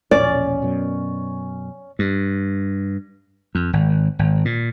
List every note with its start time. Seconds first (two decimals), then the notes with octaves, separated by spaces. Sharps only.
0.11 E1 A#1 C#4 D5
0.62 F#2 B2
1.99 G2
3.55 F2
3.73 G#1
4.19 G#1
4.45 A#2